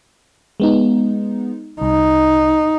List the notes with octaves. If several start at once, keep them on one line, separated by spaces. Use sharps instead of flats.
G#3 B3 D#4
C2 D#4